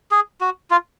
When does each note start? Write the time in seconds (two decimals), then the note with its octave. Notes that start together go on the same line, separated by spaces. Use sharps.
0.11 G#4
0.41 F#4
0.71 F4